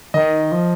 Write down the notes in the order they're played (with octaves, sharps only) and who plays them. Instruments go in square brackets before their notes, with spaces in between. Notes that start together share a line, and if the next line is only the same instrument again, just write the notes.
[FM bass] D#3 [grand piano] D#5
[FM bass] F3